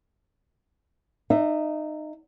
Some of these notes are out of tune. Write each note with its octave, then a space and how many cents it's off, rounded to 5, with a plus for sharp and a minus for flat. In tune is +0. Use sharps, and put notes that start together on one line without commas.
D#4 -20 E5 +10